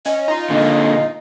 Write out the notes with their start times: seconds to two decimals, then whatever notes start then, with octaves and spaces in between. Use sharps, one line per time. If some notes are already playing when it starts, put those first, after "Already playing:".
0.06 C#4 D#5
0.28 D#4 F4
0.50 A#2 D3